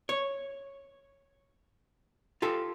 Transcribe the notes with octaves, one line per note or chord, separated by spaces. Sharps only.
C#5
F4 G4 A4